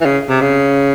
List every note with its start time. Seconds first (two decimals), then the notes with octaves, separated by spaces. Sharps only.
0.01 E3
0.06 C#3
0.29 C3
0.41 C#3